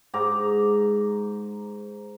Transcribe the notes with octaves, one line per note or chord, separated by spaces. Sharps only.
G#2 A#5 D6